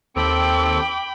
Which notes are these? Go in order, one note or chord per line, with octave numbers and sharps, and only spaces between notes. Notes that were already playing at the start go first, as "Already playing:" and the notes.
D#2 C4 A4 G5 B5 D6